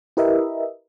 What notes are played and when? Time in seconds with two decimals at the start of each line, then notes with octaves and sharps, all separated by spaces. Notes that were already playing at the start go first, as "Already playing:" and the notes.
0.17 E4 G4 A#4 B4 D#5 E5